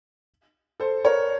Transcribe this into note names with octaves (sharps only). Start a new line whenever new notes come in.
A4 C5
A#4 C#5